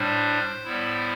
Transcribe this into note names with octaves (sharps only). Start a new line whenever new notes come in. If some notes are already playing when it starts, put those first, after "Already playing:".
Already playing: A2 G3 D4 C5
A2 G3 B3 E4